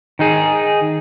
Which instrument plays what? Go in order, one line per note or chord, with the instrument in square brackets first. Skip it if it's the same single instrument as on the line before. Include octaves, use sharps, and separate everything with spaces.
[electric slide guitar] D#3 D#4 G#4